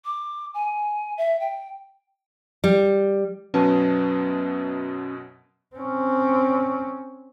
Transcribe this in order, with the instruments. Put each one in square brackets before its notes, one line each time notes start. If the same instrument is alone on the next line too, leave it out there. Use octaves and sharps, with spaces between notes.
[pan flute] D6
G#5
E5
G5
[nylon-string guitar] G3
[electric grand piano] F#2 B2 F#3 [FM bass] C#4 [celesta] B4 A5
[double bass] C4 C#4